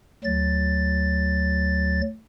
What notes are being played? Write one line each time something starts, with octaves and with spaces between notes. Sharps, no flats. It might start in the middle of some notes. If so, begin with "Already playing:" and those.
D2 F#3 A6